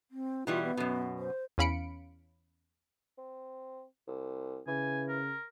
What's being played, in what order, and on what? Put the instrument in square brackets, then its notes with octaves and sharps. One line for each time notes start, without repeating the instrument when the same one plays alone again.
[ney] C4
[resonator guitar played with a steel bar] B2 E3 G3 [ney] F4
[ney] B3
[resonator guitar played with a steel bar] F#2 B2
[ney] C5
[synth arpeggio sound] E2 C#4 F5 B5 C#7 D7
[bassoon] C4
C2
[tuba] C#3 [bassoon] E3 [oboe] G#5
[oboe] A#4